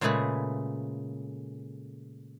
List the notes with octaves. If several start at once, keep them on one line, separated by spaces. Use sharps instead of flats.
A#2 C#3 G#3 A3 G#4 B4